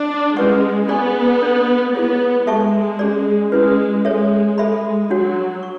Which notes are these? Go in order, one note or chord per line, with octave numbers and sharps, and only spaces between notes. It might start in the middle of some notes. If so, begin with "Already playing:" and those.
Already playing: D4
G#3 C#4 E4 B4 F#5 C#6
B3 G#4 D5 G#5 C#6
D4 A4 D5
B3 E4 G#4 C#5
G#3 A4 E5 A5 C#6
C#4 G#4 D5
G#3 C#4 E4 B4
G#3 A4 C#5 E5
G#3 A4 E5 B5
F#3 D4 F#4 C#5 F#5
C#6